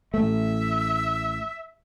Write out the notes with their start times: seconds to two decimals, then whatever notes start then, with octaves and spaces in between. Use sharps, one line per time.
0.14 A1 A3 E5